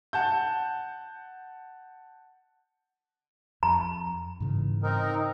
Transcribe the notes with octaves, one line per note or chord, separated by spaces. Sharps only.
F#5 A5 G6
F2 A#5
G#2 C#3 E3
C4 D#4 A#4